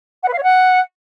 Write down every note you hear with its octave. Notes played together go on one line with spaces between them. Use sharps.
F#5
B4
F5
C#5
F#5